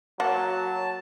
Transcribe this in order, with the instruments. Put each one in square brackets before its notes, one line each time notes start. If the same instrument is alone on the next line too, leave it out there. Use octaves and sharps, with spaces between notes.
[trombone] F#3 [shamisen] A#3 F#5 [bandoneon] A5